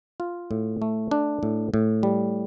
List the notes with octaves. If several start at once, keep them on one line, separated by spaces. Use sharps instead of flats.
F4
A2
A3
D4
A2
A2
G3